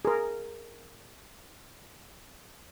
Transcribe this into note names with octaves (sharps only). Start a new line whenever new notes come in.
G#4 A#4